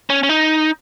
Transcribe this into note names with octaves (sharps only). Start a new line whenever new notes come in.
C#4
C#4
D#4